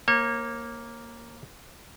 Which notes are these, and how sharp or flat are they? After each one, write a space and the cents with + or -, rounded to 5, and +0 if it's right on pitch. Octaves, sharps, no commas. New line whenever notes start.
A#3 +0 C#5 -35